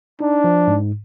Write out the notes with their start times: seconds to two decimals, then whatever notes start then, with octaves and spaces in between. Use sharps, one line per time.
0.20 D4 D#4
0.44 F3
0.67 G#2